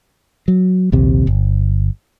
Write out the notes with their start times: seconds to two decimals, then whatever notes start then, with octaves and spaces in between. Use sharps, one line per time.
0.48 F#3
0.92 A#1 D#2 C3
1.27 G1